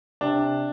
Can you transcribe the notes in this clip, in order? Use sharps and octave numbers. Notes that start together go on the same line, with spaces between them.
C3 D4